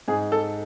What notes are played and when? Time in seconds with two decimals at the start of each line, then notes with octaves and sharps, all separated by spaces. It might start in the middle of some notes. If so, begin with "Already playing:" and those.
0.08 G#2 G#4
0.32 A4